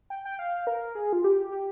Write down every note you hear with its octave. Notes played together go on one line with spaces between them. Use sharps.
G5
G5
F5
A#4
G#4
F4
G4
G4